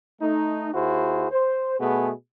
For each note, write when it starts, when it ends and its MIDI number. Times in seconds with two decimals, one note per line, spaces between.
0.21 0.71 57
0.21 0.71 63
0.74 1.26 39
0.74 1.26 64
0.74 1.26 66
0.74 1.26 68
0.74 1.26 72
1.30 1.79 72
1.79 2.11 47
1.79 2.11 57
1.79 2.11 59
1.79 2.11 68